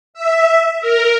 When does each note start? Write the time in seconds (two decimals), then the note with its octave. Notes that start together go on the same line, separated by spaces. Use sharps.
0.14 E5
0.81 A#4